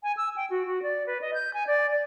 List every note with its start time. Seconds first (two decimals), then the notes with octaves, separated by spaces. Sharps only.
0.03 G#5
0.17 E6
0.36 G5
0.50 F#4
0.66 F#4
0.83 D5
1.07 B4
1.21 D#5
1.34 G6
1.54 G#5
1.67 D5
1.91 D5